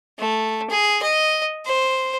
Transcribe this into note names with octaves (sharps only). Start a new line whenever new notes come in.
A3
G#4
D#5
C5